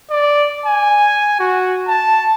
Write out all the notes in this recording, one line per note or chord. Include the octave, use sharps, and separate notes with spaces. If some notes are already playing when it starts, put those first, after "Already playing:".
D5
G#5
F#4
A5